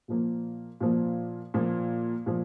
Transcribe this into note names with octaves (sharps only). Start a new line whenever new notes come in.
A#2 F3 A#3
A#2 F3 A#3
A#2 F3 A#3
A#2 F3